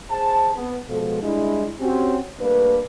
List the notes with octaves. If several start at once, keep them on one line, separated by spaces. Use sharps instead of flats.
G#4 C5 A5
B3
B2 F3 G#3 A4
G3 G#3 D4 E4
C4 C#4 F#4 G4
G3 A3 A#3 D4 B4